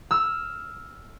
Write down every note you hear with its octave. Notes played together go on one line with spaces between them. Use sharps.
E6 F6